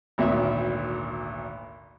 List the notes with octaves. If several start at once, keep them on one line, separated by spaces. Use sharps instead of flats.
G#1 D2 A#2 E5